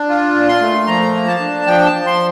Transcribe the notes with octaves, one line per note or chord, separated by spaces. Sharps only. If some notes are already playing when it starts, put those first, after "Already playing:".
Already playing: D4
F4
A#2
C6
A3
F3 A#5
A#3
A5
D4
F3 G5
A5
F3
C6